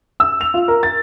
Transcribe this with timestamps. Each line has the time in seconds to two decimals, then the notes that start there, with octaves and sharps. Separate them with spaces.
0.20 E6
0.41 F7
0.54 F4
0.68 A#4
0.83 A6